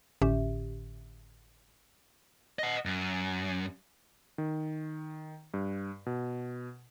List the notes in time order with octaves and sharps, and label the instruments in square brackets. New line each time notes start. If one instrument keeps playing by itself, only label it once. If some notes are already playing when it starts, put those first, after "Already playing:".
[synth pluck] G#1 A2 D3 C#4 G4 E5
[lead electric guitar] D#5 F#5
F#2
[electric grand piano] D#3
G2
B2